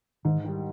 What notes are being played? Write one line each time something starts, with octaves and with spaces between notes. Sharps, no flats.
G#2 D#3
D#3 G3